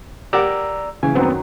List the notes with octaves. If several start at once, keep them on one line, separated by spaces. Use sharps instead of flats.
G4 A#4 D5 F#5 A#5 E6
C#3 E3 G#5
F#2 D#3 F#3 B3 C4